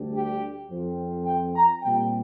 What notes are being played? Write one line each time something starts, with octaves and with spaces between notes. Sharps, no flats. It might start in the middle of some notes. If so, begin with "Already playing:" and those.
Already playing: D2 D3 G3 D4
G4
F2 F3 C4
G5
A#5
A#2 G3 C4 G5